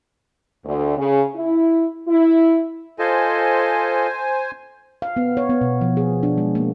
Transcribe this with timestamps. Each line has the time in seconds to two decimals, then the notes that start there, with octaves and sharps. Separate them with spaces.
0.65 D2
0.97 C#3
1.35 E4
2.08 E4
2.99 F4 A4 C5 D#5 G#5
5.02 F5
5.16 B3
5.37 C#5
5.49 B3
5.61 B2
5.81 F3
5.97 G#4
6.23 D4
6.38 G#3
6.55 A#3